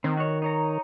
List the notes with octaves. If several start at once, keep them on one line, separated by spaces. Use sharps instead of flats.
D#3 C4
F#4 C#5
D#4 C#5 A#5